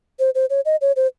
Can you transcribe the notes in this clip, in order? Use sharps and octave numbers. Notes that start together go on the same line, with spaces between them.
C5
C5
C#5
D#5
C#5
C5